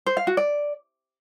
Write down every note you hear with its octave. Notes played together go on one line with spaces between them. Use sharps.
C5
F5
F#4
D5